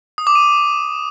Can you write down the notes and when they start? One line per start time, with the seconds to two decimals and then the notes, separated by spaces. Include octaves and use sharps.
0.18 D#6
0.27 D6
0.35 D#7